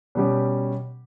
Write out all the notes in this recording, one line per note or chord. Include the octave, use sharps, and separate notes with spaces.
B2 G3 C#4 G4